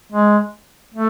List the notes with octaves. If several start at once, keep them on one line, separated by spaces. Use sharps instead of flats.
G#3
A3